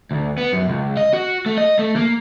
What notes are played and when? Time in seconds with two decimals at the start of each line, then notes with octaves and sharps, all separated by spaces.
0.11 D2
0.38 B3
0.53 F#2
0.68 C#2
0.97 D#5
1.13 F#4
1.46 A3
1.58 D#5
1.79 A3
1.96 A#3